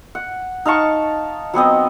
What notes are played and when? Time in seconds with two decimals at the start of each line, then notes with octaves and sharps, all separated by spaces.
0.15 F#5
0.65 D#4 F5 A5 C#6
1.54 F#3 B3 C4 D#5